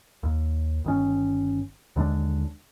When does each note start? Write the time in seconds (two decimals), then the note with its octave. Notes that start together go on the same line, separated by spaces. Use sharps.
0.23 D#2
0.84 G1 D#3 C#4
1.96 D#2 D3 G#3 D4